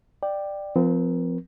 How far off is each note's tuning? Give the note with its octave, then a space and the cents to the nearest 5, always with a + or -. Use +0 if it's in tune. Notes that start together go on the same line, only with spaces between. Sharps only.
D5 +15 G5 +0
F3 +0 C4 -25 A#4 +25